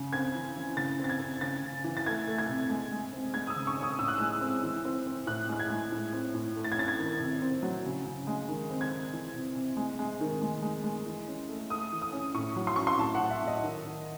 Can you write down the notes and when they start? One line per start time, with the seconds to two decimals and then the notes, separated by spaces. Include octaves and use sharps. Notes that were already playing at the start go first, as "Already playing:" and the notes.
Already playing: C#3
0.13 C4 G#6
0.35 E3
0.56 E3
0.77 C#3 A6
0.99 C4
1.04 A6
1.10 G#6
1.20 C4
1.41 C#3 A6
1.62 C#3
1.84 E3
1.97 A6
2.06 A3 G#6
2.27 A3
2.38 G#6
2.49 C3
2.70 G#3
2.92 G#3
3.13 C4
3.34 G#3 G#6
3.47 D#6
3.50 E6
3.56 C#3
3.67 C#6
3.77 C#4
3.83 D#6
3.98 A2 E6
4.08 F#6
4.18 G#3 E6
4.41 C4
4.63 E3
4.85 C4
5.06 C4
5.27 A2 F#6
5.48 G#3 F#6
5.60 G#6
5.70 G#3
5.92 A2
6.13 C4
6.35 A2
6.56 A3
6.64 A6
6.72 G#6
6.77 C#4 A6
6.88 G#6
6.99 D#3
7.20 C3
7.42 C4
7.63 F#3
7.85 C#3
8.06 C#3
8.27 G#3
8.48 D#3
8.70 C4
8.81 G#6
8.91 C4
9.13 E3
9.34 C3
9.55 C3
9.77 G#3
9.99 G#3
10.21 D#3
10.41 G#3
10.62 G#3
10.84 G#3
11.06 E3
11.28 C#4
11.49 A3
11.70 A3 D#6
11.92 E3
12.02 D#6
12.12 C#4
12.35 A2 C#6
12.56 F#3
12.67 C6
12.76 C#4 C#6
12.87 C6
12.99 A2 A5
13.15 F#5
13.20 A2
13.30 E5
13.42 A2
13.47 D#5
13.62 D#3
13.85 D#3